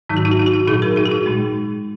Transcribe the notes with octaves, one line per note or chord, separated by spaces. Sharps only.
G#2 D#3 F#3 D#4
F#4
D#4
F#4
D#4
F#4
D#4
A#2 F#3 D#4 G#4
F#4 A#4
D#4 G#4
F#4
D#4
A#2 G#3